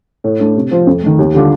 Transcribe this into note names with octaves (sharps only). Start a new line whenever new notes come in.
A2
A3 D4
C3
F3 C4 F4
F2
D#3 A3
D#2
D3 G3 D4 F4